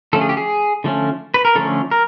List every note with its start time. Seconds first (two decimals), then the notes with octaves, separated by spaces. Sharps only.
0.13 D3 F3 A3 C#4 A4
0.21 G#4
0.29 G4
0.37 G#4
0.84 D3 F3 A3 C#4
1.34 B4
1.45 A#4
1.55 D3 F3 A3 C#4 A4
1.91 A#4